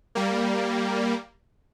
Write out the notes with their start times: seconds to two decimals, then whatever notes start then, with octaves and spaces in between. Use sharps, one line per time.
0.15 G3 A#3